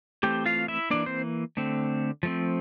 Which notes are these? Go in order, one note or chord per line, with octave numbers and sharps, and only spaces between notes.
E3 A3 C4 G4 G5
F4 F5
E4 E5
E3 A#3 D4 D5
C4 C5
D3 A3 C4
F3 A3 C4